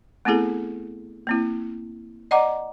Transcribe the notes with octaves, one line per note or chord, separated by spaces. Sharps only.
A3 B3 C4 E4 G#4 A4
A#3 C4 E4
D5 D#5 F#5 A#5 D6